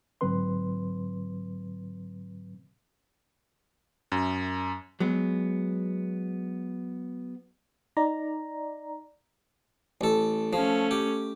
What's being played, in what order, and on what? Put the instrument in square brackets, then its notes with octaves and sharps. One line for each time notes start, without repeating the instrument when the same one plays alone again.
[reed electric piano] G#2 D3 F#3 C4 B4 C6
[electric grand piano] F#2
[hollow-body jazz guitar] F#3 G#3 B3
[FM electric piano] D#4 D5 A#5
[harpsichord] A1 A4
[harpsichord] F3 [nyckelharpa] A3 C#4
[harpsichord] G4